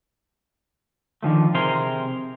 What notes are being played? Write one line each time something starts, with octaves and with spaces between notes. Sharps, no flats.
D3 D#3 F3 A3
C3 G#4 A#4 C5 C6